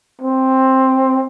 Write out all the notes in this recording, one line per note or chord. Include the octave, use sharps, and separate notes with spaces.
C4